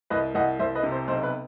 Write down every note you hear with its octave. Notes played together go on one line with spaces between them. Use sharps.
C2 B4 D#5
C2 D#5 F#5
C2 C5 E5
B4 D#5
C3
C5
B1 C5
B4